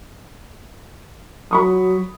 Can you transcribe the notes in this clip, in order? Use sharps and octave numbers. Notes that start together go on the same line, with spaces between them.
F#3 B5 C#6 D#6